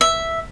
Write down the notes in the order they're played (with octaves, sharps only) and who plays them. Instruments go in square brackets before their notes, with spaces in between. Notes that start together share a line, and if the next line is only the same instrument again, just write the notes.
[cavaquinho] E5